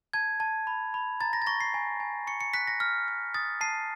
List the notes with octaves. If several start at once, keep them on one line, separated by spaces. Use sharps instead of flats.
A5 G#6
A5
B5
B5
A#5 A6
A#6
A6
C#6 A#6
C7
G#5
G#5
C#6 C#7
C#7
F#6 B6
A#6
F6
F6
D#6 A6
A5 C7